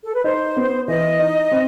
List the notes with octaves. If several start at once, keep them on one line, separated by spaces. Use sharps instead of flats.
A4
B4
D#4 C5
B3
E3 D#5
D#4
C4